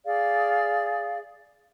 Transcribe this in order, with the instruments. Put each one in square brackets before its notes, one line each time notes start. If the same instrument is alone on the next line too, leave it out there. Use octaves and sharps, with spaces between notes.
[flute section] G#4 D5 F5